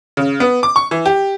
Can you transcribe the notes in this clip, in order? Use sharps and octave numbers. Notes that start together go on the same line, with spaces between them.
C#3
B3
D6
C#6
E3
G4